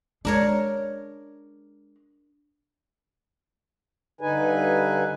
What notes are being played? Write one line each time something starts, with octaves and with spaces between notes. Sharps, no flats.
G#3 D4 A#4 C#5
G2 D3 D#4 B4 G#5